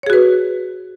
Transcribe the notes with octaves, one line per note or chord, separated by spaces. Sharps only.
F#4 G#4 B4 C#5